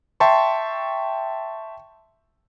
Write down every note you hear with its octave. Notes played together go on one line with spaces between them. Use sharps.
E5 G5 A5 C6 C#6